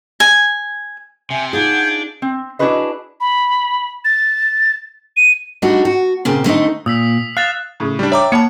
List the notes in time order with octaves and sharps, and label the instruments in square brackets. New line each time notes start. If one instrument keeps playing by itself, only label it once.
[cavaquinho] G#5
[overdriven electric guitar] C3 [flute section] E5 G#5
[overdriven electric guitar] D4 [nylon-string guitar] D#4 F4 G#4 [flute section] F#5 G6 G#6
[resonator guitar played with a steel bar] C4
D4 E4 F#4 G#4 B4 D#5
[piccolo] B5
A6
D#7
[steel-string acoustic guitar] G3 A3 D4 D#4 F#4
F#4
A#2 C#3 C4
D3 A3 C4 D#4
[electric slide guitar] A#2 [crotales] D#6 E6 B6
[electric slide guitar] F5 [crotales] F#6 A6 E7
[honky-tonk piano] A2 C#3
[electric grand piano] G3 D4
[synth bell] C#5 A#5 D6 [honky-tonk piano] D5 G5 [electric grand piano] E5
[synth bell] A#3 A5 [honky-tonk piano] C#5 F#5 B5 [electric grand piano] C#7